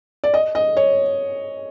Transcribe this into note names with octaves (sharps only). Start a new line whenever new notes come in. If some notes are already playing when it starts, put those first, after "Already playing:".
D5
D#5
D#5
C#5